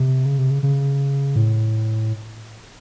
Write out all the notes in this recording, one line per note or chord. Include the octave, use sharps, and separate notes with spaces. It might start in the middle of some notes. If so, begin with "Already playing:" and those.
Already playing: C3
C#3
C3
C#3
C#3
A2